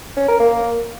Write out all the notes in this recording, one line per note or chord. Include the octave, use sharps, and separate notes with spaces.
C#4
A#4
A#3